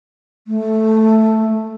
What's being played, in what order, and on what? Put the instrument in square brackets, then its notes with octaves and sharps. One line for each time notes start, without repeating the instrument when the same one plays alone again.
[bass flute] A3